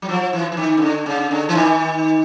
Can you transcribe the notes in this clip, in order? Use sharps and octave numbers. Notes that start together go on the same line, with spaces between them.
F#3
F3
E3
E3
D#3
C#3
D3
C#3
D3
E3
D#3